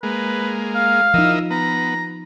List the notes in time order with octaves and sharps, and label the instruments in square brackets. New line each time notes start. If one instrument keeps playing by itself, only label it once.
[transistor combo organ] G#3 A#3 [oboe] B4
[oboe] F5
[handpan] F3 D#4 [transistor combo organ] E4 A#4 D#5
[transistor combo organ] B3 [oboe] A#5